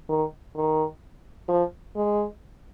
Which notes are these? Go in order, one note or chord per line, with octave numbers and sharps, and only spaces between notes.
D#3
D#3
F3
G#3